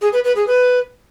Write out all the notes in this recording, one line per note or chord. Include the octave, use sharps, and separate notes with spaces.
G#4
B4
B4
G#4
B4